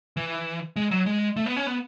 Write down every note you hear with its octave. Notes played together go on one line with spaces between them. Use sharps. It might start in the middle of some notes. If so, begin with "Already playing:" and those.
E3
G#3
F#3
G#3
A3
B3
C#4
B3